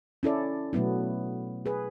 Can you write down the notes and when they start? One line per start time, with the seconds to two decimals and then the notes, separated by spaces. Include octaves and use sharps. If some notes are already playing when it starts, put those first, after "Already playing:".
0.23 C#4 E4 A4 D5
0.73 B2 F#3 A3 B3 E4
1.66 G#4 B4